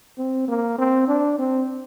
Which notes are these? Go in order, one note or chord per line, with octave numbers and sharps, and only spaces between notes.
C4
A#3
C4
D4
C4